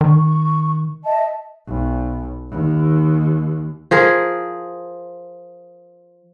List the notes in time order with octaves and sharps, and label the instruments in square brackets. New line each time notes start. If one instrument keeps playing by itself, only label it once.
[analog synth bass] D#3 [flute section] C#6
[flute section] D#5 E5 A5
[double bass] B1
D#2
[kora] F3 G#4 A#4